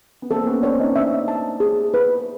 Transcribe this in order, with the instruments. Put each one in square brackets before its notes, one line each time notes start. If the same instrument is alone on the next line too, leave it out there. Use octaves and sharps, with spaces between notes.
[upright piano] B3
[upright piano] A#3 C4 [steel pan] A4
[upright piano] B3 C#4
[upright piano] C4 D4 [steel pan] C#5
[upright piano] C#4 D#4
[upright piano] C4 D4 [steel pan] E5
[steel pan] A5
G#4
B4